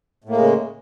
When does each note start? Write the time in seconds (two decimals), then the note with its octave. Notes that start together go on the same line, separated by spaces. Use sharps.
0.24 A2
0.29 A#3
0.34 G#3
0.39 C#3